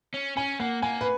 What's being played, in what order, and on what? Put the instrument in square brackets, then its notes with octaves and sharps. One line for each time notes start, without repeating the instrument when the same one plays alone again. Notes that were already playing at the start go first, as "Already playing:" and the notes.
[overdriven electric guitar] C#4
[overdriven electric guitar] C#4 [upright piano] G#5
[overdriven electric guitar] A#3 [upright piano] F#5
[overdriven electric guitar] A#3 [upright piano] G#5
[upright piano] B4